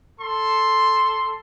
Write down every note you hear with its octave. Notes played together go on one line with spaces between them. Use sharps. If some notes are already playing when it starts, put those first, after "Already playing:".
A4 C6